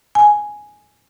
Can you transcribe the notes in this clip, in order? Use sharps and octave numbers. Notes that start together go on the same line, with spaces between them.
G#5